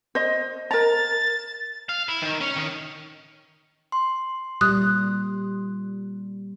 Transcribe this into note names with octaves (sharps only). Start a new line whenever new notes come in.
C5 D#5
A#4 A#5 A6
F5
E4
D#3
C#4
D#3
C6
A#2 G3 D#6 F#6